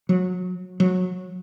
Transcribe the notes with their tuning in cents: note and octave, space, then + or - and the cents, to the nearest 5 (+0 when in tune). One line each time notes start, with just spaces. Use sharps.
F#3 -25
F#3 -20